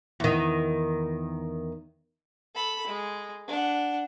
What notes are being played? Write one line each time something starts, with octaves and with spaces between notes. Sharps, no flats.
E2 D#3
A4 B5
G#3
D4 F#5